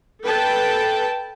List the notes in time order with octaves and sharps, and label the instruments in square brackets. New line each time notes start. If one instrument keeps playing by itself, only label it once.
[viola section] A4 B4 G5 A5